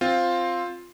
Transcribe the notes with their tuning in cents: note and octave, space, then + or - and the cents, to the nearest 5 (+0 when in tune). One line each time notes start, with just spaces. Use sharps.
C4 +5 F4 +5